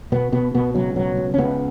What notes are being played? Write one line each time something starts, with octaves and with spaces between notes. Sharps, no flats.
B2 B3
B2 B3
B2 B3
C#2 F#3
B2 F#3
C#2
C#4
C#2 B3